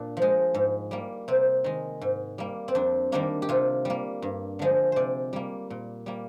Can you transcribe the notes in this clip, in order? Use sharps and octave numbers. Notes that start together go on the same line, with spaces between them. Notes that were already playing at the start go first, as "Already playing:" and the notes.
Already playing: A#2 D4
F3 G#3
G#2
G3 A#3
C3 C4
D#3 G#3
G#2
G3 A#3
C4
F2 D4
D#3 G3 A#3 D4
G4
C3 F4
G3 A#3
G2
D3 F3 G#3
C3 C5 D5
G3 A#3
A#2
G3 A#3